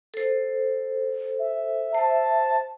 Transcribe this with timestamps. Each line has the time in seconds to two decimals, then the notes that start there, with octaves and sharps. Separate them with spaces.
0.14 A4 C5
1.39 E5
1.95 C5 A5